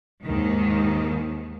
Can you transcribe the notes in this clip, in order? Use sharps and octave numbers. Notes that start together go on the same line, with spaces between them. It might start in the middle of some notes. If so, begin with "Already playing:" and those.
D#2 G#2 D#3